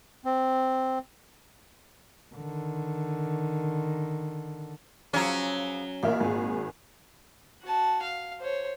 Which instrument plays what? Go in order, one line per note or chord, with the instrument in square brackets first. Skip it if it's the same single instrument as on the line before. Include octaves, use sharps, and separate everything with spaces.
[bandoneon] C4
[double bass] D3 D#3
[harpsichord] C#3 F3 [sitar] F#3 C#4
[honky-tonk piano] A1 A#4 E5 [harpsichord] A#2
[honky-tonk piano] G#1 G#4
[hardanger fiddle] F#4 A5
F5
C5 C#5